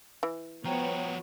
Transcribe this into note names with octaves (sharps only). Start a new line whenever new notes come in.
E3
F3 B3 F#4 C5 C#5 G5 A#5